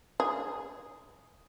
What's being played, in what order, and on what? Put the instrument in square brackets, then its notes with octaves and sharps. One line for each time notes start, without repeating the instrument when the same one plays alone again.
[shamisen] G#4